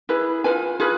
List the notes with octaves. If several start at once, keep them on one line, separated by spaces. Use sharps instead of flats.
E4 G#4 B4
F4 G#4 B4 G#5
F4 G#4 B4